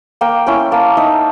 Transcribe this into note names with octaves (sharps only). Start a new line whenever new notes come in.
A#3 G5
C#4 E4 G5
A#3 A5
D#4 E5